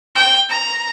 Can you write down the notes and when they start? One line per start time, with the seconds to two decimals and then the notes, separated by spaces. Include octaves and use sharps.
0.15 G5
0.50 A#5